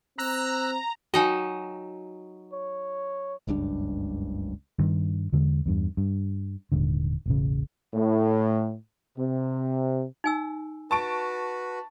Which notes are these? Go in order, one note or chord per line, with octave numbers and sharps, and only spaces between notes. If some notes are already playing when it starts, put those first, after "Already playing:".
C4 A#5 E6 F#6
F#3 D#4 F#4 D#5 G5 G#5
C#5
F#1 C#2 G2 D4
G2 D#3
E2 D3 G#3
E2 G2
G2
D#1 G#2 D3
E1 A1 C#3
A2
C3
D#4 G#5 E6
F#4 B4 A5 C#6 D7